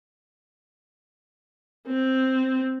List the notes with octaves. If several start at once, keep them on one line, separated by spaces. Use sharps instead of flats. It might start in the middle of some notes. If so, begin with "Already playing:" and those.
C4